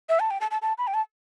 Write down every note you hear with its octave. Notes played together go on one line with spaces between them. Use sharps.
E5
A5
G5
A5
A5
A5
B5
G5
A5